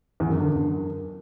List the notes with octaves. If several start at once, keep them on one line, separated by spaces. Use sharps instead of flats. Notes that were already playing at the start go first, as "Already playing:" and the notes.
E2
F#2
D3
F#2